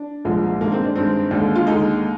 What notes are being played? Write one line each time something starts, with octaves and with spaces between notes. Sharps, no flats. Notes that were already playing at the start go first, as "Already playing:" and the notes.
Already playing: D4
C2 A#2 F3 G#3
G2 D#3 G#3 A#3
C4
D4
G2 D#3 G#3 C4
D#2 D3 G#3 D4
F4
D#2 D3 G#3 D#4